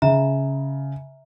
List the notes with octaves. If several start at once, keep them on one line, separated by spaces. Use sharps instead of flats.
C#3 E5 A#5